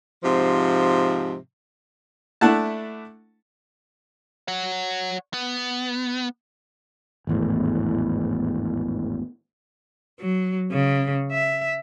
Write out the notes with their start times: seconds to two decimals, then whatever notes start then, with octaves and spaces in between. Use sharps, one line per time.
0.23 G#2 C3 F3
2.41 A3 D4 E4 F#5 A5
4.48 C#5 F#5
5.34 B3
7.27 G#1 E2 A2
10.20 F#3
10.72 C#3
11.32 E5